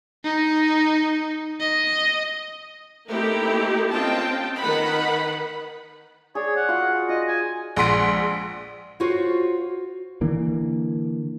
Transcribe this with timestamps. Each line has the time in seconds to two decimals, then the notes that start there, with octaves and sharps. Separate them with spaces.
0.24 D#4
1.60 D#5
3.08 A3 A#3 C4 D#4 E4 G4
3.92 C4 C#4 F4 D#5 G5 A5
4.60 D#3 B4 F#5 B5
6.35 G#4 C#5 D5
6.56 F#5
6.69 F4 F#4
7.09 F4 D#5
7.28 G#5
7.76 A#1 G#3 F#5 C6 B6 D7
9.00 F4 F#4 C5 C#5
10.21 D3 E3 A#3